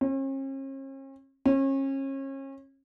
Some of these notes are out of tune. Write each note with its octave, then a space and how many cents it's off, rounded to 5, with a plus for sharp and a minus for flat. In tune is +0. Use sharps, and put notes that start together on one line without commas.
C#4 -45
C#4 -35